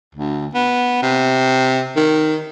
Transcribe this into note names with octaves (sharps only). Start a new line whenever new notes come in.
D2
B3
C3
D#3